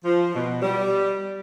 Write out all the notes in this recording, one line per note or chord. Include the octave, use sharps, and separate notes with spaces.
F3
B2
G3